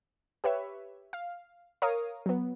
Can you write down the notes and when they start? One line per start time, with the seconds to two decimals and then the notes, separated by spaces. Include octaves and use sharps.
0.44 G4 B4 C#5 E5
1.13 F5
1.82 A#4 C#5 F5 D#6
2.26 F#3 B3